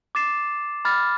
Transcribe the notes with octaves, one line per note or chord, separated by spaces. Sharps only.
D6 A6 C7 E7
B5 D6 F6 A6